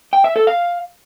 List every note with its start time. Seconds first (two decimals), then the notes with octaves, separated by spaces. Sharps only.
0.13 G5
0.24 E5
0.36 A4
0.47 F5